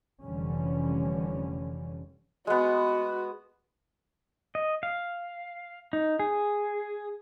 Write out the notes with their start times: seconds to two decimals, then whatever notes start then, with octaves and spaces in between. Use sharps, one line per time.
0.21 F1 D3 E3 G3 C#4
2.47 G#3 B3 F#4
4.55 D#5
4.83 F5
5.93 D#4
6.20 G#4